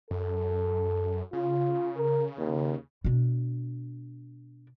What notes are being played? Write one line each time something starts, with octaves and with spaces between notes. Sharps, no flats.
F#2 A4
C#3 F4
A#4
D#2
B2 D4